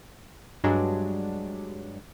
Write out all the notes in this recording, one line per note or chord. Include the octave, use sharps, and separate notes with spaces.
G2 F#3 G#3 D4